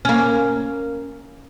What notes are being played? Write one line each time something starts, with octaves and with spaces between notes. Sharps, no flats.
A#3 C#4